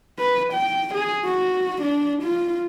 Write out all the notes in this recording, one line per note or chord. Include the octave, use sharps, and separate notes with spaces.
B4
G5
G#4
F#4
D4
F4